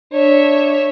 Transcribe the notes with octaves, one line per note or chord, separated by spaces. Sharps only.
D4 C#5 E5